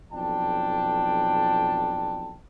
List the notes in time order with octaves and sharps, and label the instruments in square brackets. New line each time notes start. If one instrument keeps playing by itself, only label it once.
[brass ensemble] B1 F2 D4 G5 A5